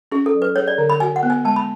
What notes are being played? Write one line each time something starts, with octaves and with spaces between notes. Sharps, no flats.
C#4 G#4
A4
F#3
B4
G#4 C#5
D5
D3
B5
F#4 G#5
F#5
B3
G#5
G#3 A5
B5